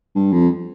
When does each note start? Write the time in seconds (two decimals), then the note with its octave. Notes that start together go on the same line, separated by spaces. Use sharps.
0.15 G2
0.33 F2